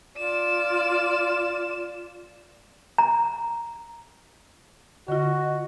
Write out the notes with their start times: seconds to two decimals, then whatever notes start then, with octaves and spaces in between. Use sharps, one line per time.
0.17 F4 D5 E7
2.98 A#5
5.08 D3 F4 F#4 D#5